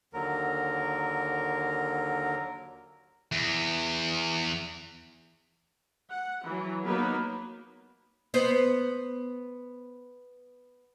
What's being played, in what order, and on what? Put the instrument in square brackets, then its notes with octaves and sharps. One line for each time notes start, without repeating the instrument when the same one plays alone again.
[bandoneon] D#2 D3 F#3 A#4
[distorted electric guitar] E2
[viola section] F#5
E3 F#3
F#3 A#3 B3 D#4 A#4 B4
[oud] B3 C5